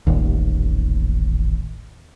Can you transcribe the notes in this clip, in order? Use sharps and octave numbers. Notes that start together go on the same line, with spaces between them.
D#1 A1 D#2